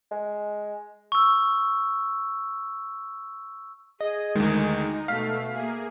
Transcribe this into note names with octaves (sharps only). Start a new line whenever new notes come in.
G#3
C#6 E6
G#4 D#5
D2 D#3 G#3 D#4
B2 A3 A4 F5 F6 B6
A#3 G#4 E5